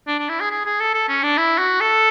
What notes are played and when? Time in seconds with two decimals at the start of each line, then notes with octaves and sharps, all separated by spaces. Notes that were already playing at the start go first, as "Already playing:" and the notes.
0.07 D4
0.19 D4
0.29 E4
0.40 G#4
0.51 G#4
0.66 G#4
0.80 A4
0.94 A4
1.08 C#4
1.23 D4
1.37 E4
1.59 F#4
1.81 A4